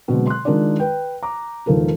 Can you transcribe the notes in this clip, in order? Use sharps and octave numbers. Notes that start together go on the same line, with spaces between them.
B2 D3 F#3 G#3 C4
C6 F#6
D#3 G#3 D4 F4 A#4 D5
B4 G5
A#5 D6
E1 D#3 F3 A4 A#4